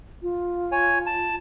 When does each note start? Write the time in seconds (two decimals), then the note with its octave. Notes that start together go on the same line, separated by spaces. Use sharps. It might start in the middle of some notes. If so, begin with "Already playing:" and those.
0.23 F4
0.72 C#5 G#5
1.06 A5